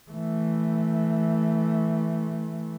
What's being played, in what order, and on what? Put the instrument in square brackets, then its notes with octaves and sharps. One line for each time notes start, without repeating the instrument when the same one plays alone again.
[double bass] E3 A3